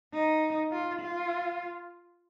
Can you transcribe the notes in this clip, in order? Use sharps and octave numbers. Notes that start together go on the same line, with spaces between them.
D#4
F4
F4